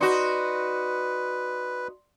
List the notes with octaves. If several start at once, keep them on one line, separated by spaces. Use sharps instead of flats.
D#4 F#4 B4 D5 C6 C#7